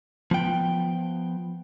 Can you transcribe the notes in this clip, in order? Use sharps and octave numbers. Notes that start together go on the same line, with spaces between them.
F3 B3 G5